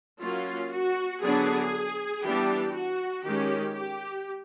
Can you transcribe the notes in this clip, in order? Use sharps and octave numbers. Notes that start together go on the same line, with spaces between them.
F#3 A#3 C#4 F4
F#4
D3 F#3 B3 D4 G#4
E3 G3 B3 D4 G4
F#4
D#3 G#3 C#4 G4
G4